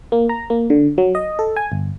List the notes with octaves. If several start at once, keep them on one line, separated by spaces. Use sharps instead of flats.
A#3
A#5
A#3
D3
F#3
D#5
A4
G#5
G1